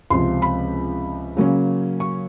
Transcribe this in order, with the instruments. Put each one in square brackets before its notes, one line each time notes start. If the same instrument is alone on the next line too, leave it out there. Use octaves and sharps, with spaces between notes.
[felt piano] C#2 C3 F3 C6
B5
C#3 F#3 A#3 C#4
C#6